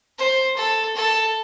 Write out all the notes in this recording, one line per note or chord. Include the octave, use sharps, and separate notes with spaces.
C5
A4
A4